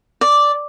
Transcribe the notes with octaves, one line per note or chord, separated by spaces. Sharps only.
D5